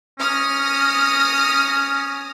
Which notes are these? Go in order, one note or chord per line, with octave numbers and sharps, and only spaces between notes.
C#4 D#6 F6 A#6